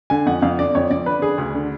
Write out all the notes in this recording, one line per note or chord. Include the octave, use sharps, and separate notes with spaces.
D3 G#5
F2 F#5
F2 F5
D3 D5
F2 C#5
F2 D5
D3 B4
D3 G#4
D2
D3